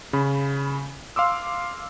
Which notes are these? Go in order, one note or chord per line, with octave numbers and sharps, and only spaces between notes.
C#3 B5
F5 C6 D6 E6